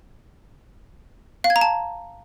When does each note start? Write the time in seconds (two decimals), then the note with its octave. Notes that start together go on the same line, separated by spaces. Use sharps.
1.44 F5
1.50 G#6
1.56 A#5
1.61 A5